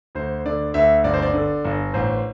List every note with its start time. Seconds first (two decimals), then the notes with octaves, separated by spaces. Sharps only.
0.15 D2 C5
0.45 D3 D5
0.74 D2 E5
1.04 G1 D5
1.14 C5
1.22 D5
1.34 D3
1.65 G1
1.94 A1 C5